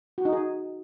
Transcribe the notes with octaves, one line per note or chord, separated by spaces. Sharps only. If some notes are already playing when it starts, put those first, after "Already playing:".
F#4
D#4
G#4